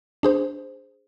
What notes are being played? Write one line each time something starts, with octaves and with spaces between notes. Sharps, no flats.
D4 G#4 C5